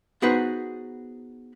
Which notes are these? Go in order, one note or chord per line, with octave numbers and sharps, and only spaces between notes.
B3 D#4 F#4 G#4 B4 C5